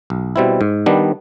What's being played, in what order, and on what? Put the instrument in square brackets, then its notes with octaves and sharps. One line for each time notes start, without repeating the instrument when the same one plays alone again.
[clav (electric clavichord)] B1
B2 G3 C4 E4
G#2
D#3 G3 B3 D4